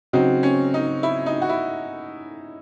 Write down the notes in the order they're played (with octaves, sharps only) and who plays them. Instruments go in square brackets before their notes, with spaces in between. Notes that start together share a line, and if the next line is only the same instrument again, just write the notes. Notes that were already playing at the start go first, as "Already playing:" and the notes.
[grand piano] C#3 F#3 C4 F#4 [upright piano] D#4
[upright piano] C#4
D#4
E4
D#4
F#4
E4